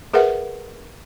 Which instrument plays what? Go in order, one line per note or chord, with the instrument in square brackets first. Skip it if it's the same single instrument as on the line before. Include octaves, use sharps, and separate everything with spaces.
[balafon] G#4 A#4 B4 E5 F#5